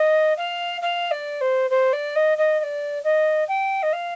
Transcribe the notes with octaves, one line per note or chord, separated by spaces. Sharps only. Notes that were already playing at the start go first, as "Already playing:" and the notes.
Already playing: D#5
F5
F5
D5
C5
C5
D5
D#5
D#5
D#5
D5
D#5
G5
D#5
F5